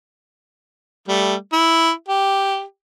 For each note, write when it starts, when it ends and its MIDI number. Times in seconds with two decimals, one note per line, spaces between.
1.08 1.35 55
1.08 1.35 57
1.53 1.91 64
2.09 2.62 67